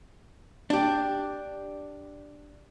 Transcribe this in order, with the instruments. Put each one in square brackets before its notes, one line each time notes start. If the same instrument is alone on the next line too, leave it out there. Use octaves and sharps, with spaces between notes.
[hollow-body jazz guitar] D4 G4